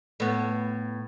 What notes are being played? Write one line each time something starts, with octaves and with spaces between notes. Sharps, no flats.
A2 B3